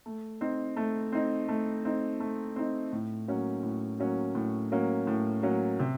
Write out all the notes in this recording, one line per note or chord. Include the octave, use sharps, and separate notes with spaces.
A3
C4 D#4
A3
C4 D#4
A3
C4 D#4
A3
C4 D#4
A2
F#3 A#3 C#4
A2
F#3 A#3 C#4
A2
F#3 A#3 C#4
A2
F#3 A#3 C#4
C3